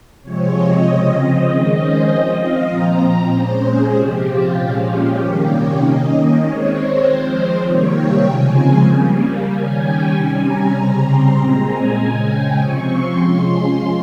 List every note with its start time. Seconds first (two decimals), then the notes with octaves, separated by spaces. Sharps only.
0.23 C3 F3 G#3 C4 C#5
0.54 D#5
0.84 C#3 F3 C4
1.16 D#5
1.46 D#3 G#3 C#4 D#5
1.77 C5
2.08 F3 C4 D#5
2.39 F5
2.70 A#2 F3 C4 A#5
3.01 A#5
3.31 A#2 G#3 C#4 C5
3.63 G#4
3.93 C3 F3 C4 G4
4.24 F4
4.55 A#2 F3 G#3 C#4
4.86 G4
5.16 C3 D#3 G3 A#3 C#4 G4
5.48 C#5
5.78 D#3 A#3 C#4 D#5
6.09 D#5
6.40 D#3 G#3 C4 C#5
6.71 C5
7.02 F3 G#3 C4
7.33 C5
7.63 C3 D#3 G3 A#3 C#5
7.95 G5
8.25 C#3 F3 G#3 C4 G#5
8.87 C#3 G3 A#3
9.49 D#3 G3 C#4 G#5
9.80 G5
10.10 C3 G3 C#4 G#5
10.41 A#5
10.72 C#3 G3 C4
11.03 C6
11.34 A#2 G#3 C4 A#5
11.65 G#5
11.96 C#3 G#3 C#4 G#5
12.26 G5
12.57 C3 F3 C4 C#6
12.88 C6
13.19 F3 G#3 C#4
13.50 C6